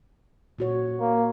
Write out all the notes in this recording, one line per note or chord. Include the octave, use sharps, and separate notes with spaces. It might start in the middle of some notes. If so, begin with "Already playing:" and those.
A#2 F#4 C#5
A#3